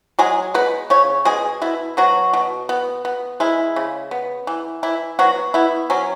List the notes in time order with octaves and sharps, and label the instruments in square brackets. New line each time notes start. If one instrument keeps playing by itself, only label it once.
[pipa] F#3 G#3 G#4
G#3 B3 B4
C#3 C#4 C#5
B2 G#3 G#4
B2 E4
B2 F#3 F#4
B2
B3
B3
G#3 E4
C#3
B3
E3
E3 E4
F#3 B3 F#4
B3 E4
F#3 C#4